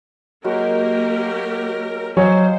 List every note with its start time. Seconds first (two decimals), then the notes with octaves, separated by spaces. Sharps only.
0.44 F#3 G#3 A#3 F#4 G4 A#4
2.17 F#3 C5 C#5 D#5 F5 G#5